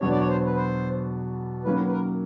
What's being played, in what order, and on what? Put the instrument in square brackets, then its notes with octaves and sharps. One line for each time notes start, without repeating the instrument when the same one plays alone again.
[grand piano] E2 B2 F#3 B3 D4 [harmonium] C#5
[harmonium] D5
C#5
C5
B4
C5
[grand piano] D#3 F#3 A#3 C#4 [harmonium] B4
[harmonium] B4
A#4